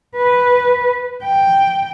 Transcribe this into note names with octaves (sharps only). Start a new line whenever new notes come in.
B4
G5